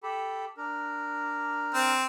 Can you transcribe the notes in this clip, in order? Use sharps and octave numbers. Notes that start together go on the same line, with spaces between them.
G4 A4 B5
D4 A#4
C4